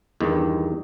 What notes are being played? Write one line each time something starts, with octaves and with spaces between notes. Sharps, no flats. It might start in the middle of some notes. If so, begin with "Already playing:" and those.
E2 G2 D#3